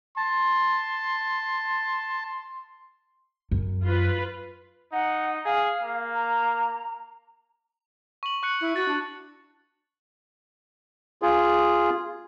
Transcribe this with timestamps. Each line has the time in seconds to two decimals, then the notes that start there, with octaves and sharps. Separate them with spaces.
0.17 A5 C6
3.51 F#2
3.84 F4 B4
4.92 D#4 F#5
5.45 G#4 F5
5.83 A#3
6.15 A#5
8.23 C#6 F#7
8.43 C#6 F#6 C#7
8.61 E4
8.76 F#4 A6
8.88 D4
11.22 F4 G#4